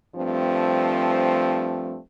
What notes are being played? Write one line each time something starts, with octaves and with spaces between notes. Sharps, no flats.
G2 F3 A3 C4